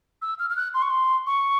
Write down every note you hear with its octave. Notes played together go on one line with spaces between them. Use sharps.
E6
F6
F6
F#6
C6
C#6
C6
C#6